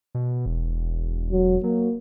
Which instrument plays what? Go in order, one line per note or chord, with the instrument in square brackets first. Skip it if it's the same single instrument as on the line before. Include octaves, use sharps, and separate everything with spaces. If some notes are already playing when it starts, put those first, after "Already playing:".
[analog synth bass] B2
E1
[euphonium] F#3
[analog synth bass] F#3 [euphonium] A#3